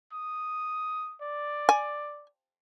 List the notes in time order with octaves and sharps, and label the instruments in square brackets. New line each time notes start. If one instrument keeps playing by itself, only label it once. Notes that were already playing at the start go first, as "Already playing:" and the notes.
[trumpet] D#6
D5
[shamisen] G#5